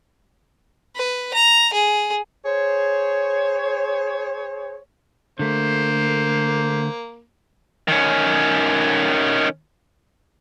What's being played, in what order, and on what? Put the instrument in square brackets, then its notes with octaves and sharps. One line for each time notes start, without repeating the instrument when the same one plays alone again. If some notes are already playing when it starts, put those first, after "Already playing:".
[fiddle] B4
A#5
G#4
[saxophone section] G#4 C5 C#5
[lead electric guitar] D3 A3 [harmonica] A#3 [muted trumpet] C5
[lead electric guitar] D#3 C#4